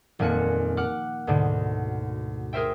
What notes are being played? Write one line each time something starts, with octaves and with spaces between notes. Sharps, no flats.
D#1 F2 A#3 G#5 F#6 C#7
F#5 D6 F6 F#6
D2 G#2 B2 D3
G#4 A#4 C5 E5 G5